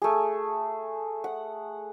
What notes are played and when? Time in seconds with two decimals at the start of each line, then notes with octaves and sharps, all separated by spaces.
0.02 A3 G#4
1.24 F#5